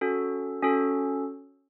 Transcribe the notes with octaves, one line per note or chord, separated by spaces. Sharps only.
C#4 F#4 A4
C#4 F#4 A4